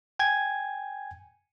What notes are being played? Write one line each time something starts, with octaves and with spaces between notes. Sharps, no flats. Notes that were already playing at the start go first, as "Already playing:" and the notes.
G5 G#5 G#6